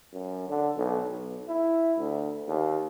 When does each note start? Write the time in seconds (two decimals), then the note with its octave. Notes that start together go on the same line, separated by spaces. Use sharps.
0.13 F#2
0.49 D3
0.77 B1
1.10 B1
1.48 E4
1.98 D2
2.48 D#2